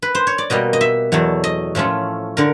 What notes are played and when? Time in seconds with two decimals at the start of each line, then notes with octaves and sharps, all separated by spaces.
0.02 B4
0.15 C5
0.27 C#5
0.38 D5
0.50 B2 G3 A#3 D#5
0.73 D#5
0.81 E5
1.12 E2 B2 F#3 A3
1.44 D#5
1.75 A2 F3 A3 C#4 F4
2.37 D3 A#4